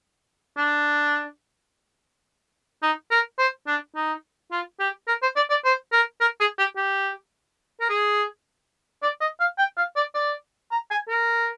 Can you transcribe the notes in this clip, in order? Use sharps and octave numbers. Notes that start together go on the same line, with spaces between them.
D4
D#4
A#4
C5
D4
D#4
F4
G4
A#4
C5
D5
D5
C5
A#4
A#4
G#4
G4
G4
A#4
G#4
D5
D#5
F5
G5
F5
D5
D5
A#5
G#5
A#4